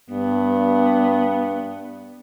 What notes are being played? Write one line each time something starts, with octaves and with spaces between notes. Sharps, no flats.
G2 B3